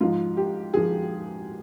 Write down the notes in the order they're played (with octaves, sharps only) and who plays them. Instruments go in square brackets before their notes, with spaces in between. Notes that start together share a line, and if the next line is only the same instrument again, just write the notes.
[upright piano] G#2 F3 F4
G4
F3 G#4